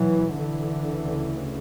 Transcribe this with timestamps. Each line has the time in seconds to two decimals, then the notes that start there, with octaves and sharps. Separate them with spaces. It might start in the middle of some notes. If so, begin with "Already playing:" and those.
Already playing: B1 B2 E3 F#3
0.36 D3 E3
0.84 D2 C#3